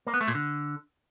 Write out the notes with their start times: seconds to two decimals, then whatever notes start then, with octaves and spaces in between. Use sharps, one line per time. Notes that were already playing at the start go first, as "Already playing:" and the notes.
0.07 A#3
0.14 B3
0.21 A3
0.28 A#2
0.35 D3